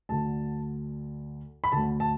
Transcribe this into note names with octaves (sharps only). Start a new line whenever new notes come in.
D2 D3 A5
B5
D2 D3 A5
A5